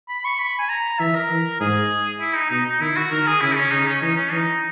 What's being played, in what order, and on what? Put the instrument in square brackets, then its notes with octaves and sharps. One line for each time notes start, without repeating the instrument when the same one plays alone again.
[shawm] B5
C#6
B5
G#5
A#5
[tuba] E3 [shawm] E5
[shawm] A#4
[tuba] E3
[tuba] G#2 [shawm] G#4
[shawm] E4
D#4
[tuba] B2 [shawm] D#4
[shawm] D#4
[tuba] D#3 [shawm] E4
[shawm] F#4
[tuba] D#3 [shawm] A#4
[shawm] G#4
[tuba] C#3 [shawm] E4
[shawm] C#4
[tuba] C#3 [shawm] D#4
[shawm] C#4
[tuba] E3 [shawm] D#4
[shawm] C#4
[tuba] E3 [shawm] D#4